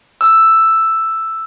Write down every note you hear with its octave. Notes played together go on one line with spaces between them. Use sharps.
E6